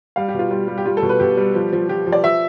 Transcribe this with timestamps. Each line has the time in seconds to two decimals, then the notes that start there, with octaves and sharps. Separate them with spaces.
0.16 G3 F5
0.28 G4
0.34 B2 F4
0.51 G3 F4
0.68 G3
0.78 G4
0.86 G3 F4
0.97 A4
1.03 B2
1.09 B4
1.20 B2 G4
1.37 G3
1.55 F3
1.73 F3
1.89 F3 G4
2.06 F3
2.12 D5
2.23 F3 E5